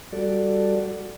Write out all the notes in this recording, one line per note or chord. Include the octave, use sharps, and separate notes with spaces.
G3 F#4 A4 D5